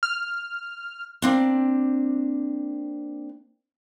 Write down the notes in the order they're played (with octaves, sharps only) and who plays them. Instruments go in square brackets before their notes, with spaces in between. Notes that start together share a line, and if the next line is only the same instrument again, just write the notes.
[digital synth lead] F6
[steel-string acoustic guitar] A#3 C4 D4